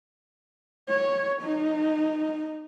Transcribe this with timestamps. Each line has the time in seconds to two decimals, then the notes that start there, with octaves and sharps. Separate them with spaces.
0.89 C#5
1.42 D#4